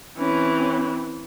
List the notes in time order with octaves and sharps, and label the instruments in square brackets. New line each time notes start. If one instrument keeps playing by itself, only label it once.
[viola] E3 C4 [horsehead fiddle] C#4